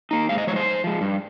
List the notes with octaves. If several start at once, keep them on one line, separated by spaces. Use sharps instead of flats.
A#3 D#4
G#2 F5
D#5
F3 G#3 C#5
C5
G#2
F3 G#3
G2